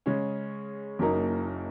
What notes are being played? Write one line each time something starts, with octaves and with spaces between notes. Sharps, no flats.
C#3 G#3 C#4
F#1 F#2 F#3 A#3 D#4